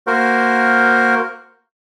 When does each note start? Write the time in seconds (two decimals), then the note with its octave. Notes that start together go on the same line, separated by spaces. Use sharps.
0.07 A#3 F#4 A#4 C5